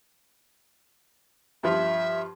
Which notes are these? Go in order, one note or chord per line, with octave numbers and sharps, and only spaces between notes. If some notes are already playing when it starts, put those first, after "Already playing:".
G2 F3 E5